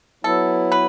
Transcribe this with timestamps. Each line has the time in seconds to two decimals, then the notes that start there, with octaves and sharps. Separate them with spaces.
0.24 F#3 B3 E4 A4
0.72 B4